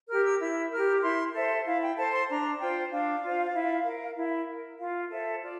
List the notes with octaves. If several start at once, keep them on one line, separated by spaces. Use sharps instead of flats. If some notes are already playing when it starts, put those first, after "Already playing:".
G4 A#4 F6
E6
E4 E6
G4 A#4 F6
E4 C6
A4 C5 E5
E4 F5
G5
A4 C5 A5
C6
D4 A#5
F4 C5 G5
D4 F5
F4 C5
E4
A#4
E4
A#4
F4 F5
A4 C5 E5
F4 D5